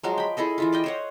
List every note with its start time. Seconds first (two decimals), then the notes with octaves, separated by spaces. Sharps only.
0.03 F3 F#3 G#3 F#4
0.18 G5 B5
0.37 E4 G#4 A4 D#5
0.58 E3 E4 F4
0.72 D5 D#5 G5
0.84 C5 C#5 F#5